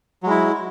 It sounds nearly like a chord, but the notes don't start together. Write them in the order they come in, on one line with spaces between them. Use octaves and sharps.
F#3 G#3 E4